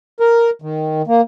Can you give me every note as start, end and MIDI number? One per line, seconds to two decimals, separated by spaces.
0.20 0.50 70
0.62 1.02 51
1.07 1.21 58